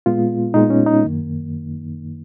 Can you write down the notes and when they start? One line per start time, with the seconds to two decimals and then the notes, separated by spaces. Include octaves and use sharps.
0.06 A#2 G#3 B3 F4
0.54 A#2 G#3 B3 D#4
0.70 C#4
0.86 D#4
1.02 F#2 D#3 A#3